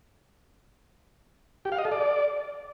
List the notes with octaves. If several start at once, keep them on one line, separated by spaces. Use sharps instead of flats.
G4
F5
D#5
A4
D5